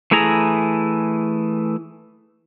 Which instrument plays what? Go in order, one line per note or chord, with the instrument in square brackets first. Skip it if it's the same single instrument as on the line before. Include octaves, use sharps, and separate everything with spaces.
[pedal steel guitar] E3 A3 E4 G#4 A#5